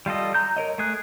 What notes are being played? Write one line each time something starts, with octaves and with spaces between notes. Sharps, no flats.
G3 F4 A4 D#5
A#5 G6
A#4 C#5 D#5
A3 G#4 F#6